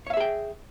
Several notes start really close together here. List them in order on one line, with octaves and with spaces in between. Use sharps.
C#5 F5 E5 G#4 G5